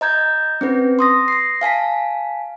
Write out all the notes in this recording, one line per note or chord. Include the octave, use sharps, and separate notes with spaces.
D#5 A#5 G6 G#6
C4 C#4 B4
C6 D#6 A#6
A#6 C7
F5 G#5 A5 B6